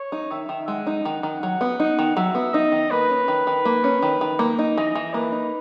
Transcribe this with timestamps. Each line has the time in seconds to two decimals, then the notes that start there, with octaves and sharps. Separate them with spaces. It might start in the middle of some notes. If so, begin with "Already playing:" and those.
Already playing: C#5
0.12 D#4
0.31 D#3 E5
0.49 D#3
0.68 G#3 F#5
0.87 D#4
1.05 D#3
1.23 D#3
1.43 F#3
1.61 B3
1.80 D#4
1.99 D#3
2.17 F#3 E5
2.35 B3
2.53 D#4 D#5
2.72 D#3
2.91 A#3 B4
3.10 C#4
3.28 D#3
3.47 D#3
3.65 A#3
3.84 C#4
4.03 D#3
4.21 D#3
4.39 A#3
4.59 D#4
4.77 E3 D#5
4.95 E3
5.14 A#3 B4
5.32 D#4